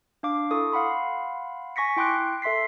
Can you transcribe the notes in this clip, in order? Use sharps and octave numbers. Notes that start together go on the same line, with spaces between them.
D4 F5 D6
E4 A4 C#6 D#6
F5 F#5 B5 C6
G#5 C#6 A#6 B6 C#7
E4 G5 C6 D6 F#6 D7
A4 E5 C6 B6 C7